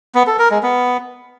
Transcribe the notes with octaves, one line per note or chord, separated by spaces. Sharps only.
B3
A4
A#4
G#3
B3